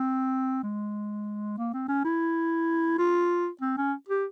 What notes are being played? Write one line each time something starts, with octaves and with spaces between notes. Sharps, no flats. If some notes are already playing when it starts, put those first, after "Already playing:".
Already playing: C4
G#3
A#3
C4
C#4
E4
F4
C4
C#4
G4